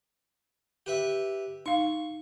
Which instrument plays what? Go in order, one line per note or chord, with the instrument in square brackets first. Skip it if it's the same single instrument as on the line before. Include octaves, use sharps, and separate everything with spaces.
[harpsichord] G4 B4 E5
[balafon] D#4 F5 [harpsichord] C#6